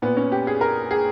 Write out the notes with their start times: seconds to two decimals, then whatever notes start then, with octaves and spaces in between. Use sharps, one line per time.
0.02 A#2 B3
0.17 C#4
0.32 G4
0.47 G#4
0.61 A#4
0.91 G#4